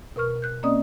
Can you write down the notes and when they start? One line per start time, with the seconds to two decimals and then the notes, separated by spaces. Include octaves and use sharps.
0.16 B2 A#4 C#6 F6
0.42 F#6 G6
0.63 A#3 C4 C#4 D5 D#5 D#6